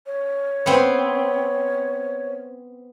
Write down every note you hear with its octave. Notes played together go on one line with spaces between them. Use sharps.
C#5
B3 C4